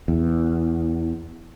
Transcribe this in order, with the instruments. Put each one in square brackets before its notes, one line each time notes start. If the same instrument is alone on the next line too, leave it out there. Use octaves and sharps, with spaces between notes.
[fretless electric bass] E2